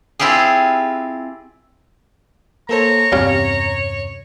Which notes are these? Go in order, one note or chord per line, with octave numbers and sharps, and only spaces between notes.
C4 E4 F4 G4 G#4
A#3 A4 C5 C#5 A#5
E2 G2 C3 C#4 G4 F5